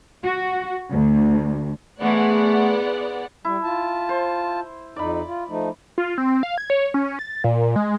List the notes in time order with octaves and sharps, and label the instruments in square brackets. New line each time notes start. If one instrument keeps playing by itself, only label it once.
[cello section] F#4
D2
[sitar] G#2 E3 G#3 [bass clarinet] A3 [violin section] B3 D5 F#5
[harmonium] G3 [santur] E4
[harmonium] F4 A5
[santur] C5
[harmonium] F2 D#4 [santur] D5 B5
[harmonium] F4
F3 A3 D#4
[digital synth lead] F4
C4
F5
G#6
C#5
C#4
A6
A#2
G#3